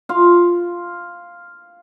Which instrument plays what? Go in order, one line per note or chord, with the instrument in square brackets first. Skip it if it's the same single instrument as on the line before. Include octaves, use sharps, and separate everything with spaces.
[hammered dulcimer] F4 F5